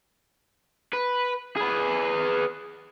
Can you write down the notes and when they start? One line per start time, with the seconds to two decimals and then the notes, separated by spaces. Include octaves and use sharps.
0.93 B4
1.57 G#4 B4